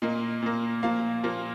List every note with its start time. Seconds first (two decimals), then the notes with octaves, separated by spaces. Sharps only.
0.02 A#2 A#3 D#5
0.42 A#2 A#3
0.83 A#2 F3 A#3 F5
1.23 A#2 F3 A#3